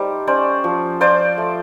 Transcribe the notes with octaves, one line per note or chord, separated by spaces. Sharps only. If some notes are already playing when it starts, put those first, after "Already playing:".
Already playing: G3 A3 D#4 C5 D5
C#4 C5 D5
F3
F4 C5 D5
A3